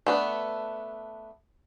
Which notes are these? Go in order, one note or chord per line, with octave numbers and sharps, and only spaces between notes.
A3 B3 D4